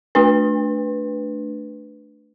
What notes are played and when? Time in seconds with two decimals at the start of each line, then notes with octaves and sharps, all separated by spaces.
0.15 A3 D4 B4